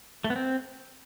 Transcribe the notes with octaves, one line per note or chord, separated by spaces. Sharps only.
A3
B3
C4